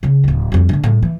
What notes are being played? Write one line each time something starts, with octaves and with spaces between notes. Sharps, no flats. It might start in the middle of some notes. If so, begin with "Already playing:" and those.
C#3 C#4
D1 B1
F2 G3
G#2 D3
A2 G3
E3